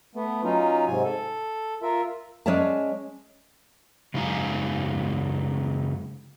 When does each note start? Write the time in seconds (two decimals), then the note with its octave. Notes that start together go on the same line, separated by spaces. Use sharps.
0.15 A3 B3
0.44 F#3 C#4 D#4 F4
0.86 G#2 C3 G#5
1.04 A4
1.82 F4 A#4 E5
2.46 G#3 C#4 C#5 D5 E5 A5
4.14 F#2 C#3 G#3 D#4 F5 G#5